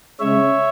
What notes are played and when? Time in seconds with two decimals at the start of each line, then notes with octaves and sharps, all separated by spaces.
0.19 C#3 G#3 C#4 C#5 E5